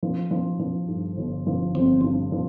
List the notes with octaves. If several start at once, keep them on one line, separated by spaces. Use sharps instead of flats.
F3
F3
F3
G2
G1
F3
G1 C4
G2
F3